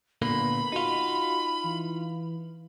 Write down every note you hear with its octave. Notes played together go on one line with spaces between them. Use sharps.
A#2 D3 A#3 B3 B5
D#4 F4 F#4
E3